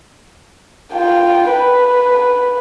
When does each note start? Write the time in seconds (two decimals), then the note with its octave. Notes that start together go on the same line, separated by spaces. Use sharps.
0.93 F4 G5
1.51 B4